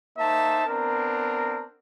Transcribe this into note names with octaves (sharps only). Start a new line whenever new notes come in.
A#3 D#4 C5 E5 A5
B3 C4 D4 A#4